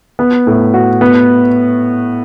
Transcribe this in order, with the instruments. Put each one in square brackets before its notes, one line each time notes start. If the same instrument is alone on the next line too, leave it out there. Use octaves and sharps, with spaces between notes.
[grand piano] B3
A2
F#4
B3